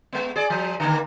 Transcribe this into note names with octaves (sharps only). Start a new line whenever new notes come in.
G#3 B3
G#4 D5
F3
D3 D#3 A#3